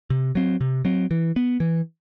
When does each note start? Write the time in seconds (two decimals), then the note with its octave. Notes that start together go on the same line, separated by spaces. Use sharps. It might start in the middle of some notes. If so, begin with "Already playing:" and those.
0.10 C3
0.35 F#3 C4
0.61 C3
0.85 F#3 C4
1.11 E3
1.36 B3
1.60 E3